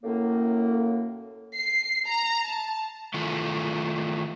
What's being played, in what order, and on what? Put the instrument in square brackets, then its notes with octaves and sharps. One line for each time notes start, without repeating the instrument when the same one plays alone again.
[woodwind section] F#2 A2 A#3
[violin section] C7
A#5
A5
[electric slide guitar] D#3 E3 A3 F4